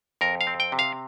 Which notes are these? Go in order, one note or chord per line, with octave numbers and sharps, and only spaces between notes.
F2 A#4
F5
C4
G5
C3
F5